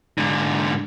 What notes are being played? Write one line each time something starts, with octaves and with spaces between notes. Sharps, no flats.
G#2 D3